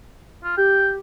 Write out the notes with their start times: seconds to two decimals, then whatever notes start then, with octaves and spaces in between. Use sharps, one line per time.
0.44 F4
0.57 G4 G5